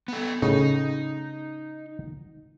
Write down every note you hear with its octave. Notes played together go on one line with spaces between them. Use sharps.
B3 A4
A2 C#3 D#4 D#5